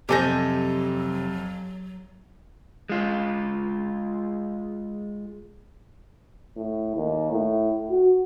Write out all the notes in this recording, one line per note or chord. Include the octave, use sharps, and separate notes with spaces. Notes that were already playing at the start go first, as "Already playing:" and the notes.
F2 C3 F#3 G4 A4 G#5 G6 A#6
G#3 F4
A2
D#2
A2
F#4